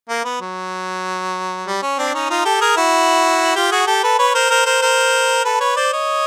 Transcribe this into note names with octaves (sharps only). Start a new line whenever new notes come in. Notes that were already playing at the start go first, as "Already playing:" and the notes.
A#3
B3
F#3
G3
C#4
C4 D4
C#4 D#4
D#4 F4
G4 A4
G#4 A#4
E4 F#4
F4 G4
F#4 G#4
G4 A4
A4 B4
B4 C#5
A#4 C5
A#4 C5
A#4 C5
A#4 C5
A4 B4
B4 C#5
C5 D5
C#5 D#5